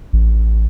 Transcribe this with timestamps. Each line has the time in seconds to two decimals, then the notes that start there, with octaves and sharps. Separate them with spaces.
0.13 A1